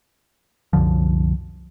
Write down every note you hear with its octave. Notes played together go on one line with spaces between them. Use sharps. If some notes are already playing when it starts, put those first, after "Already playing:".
C2 F#2 D3 F3